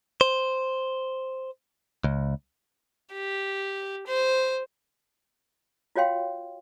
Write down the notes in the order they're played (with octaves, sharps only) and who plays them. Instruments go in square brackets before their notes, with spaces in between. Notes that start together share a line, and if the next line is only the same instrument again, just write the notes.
[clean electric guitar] C5
C#2
[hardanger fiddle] G4
C5
[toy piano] F4 F#4 C#5 F5 G5 C6